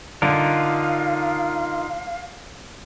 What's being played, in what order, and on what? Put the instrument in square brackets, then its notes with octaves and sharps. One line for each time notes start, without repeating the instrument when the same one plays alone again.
[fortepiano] D3 [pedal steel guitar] D#4 F4 A#4 [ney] F5